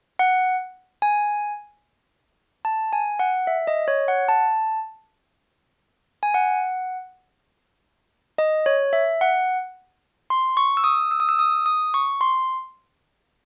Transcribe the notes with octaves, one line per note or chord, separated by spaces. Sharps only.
F#5
G#5
A5
G#5
F#5
E5
D#5
C#5
F#5
A5
G#5
F#5
D#5
C#5
E5
F#5
C6
C#6
E6
D#6
E6
D#6
E6
D#6
D#6
C#6
C6